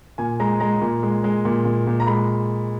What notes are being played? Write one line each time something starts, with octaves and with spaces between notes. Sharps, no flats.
A#2 G#5
G#3 A#5
G#3 A#5
A#2
G#3
G#3
A#2
A#2
A#2
A#5
G#3 B5